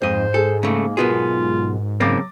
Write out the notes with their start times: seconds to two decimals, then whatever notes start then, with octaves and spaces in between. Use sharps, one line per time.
0.02 F2 G#2 C5 D#5
0.34 G#4 A4
0.63 C#3 A3 A#3
0.97 B1 B3 F4 F#4 G#4 A#4
2.00 C#3 F#3 A#3 C4 D6 A6 A#6